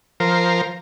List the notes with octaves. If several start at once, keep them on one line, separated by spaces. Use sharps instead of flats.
F3 A#4 C5